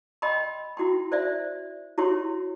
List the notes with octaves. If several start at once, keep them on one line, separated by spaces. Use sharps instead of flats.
D#5 G5 B5 C6
E4 F#4 G5 C6
C5 D5 E5
E4 F#4 G4 C#5 C6